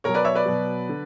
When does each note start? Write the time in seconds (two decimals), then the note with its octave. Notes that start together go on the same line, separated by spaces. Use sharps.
0.04 B2 F#3 A#4 C#5
0.14 B4 D5
0.25 C#5 E5
0.35 B4 D5
0.46 B2 F#3
0.89 D3